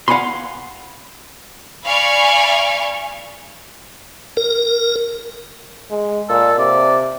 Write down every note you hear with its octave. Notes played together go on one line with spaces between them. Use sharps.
F5 F#5 G#5 B5 C6
D5 F5 G#5 B5 C#6
A#4
G#3
A#2 A4
C3 D5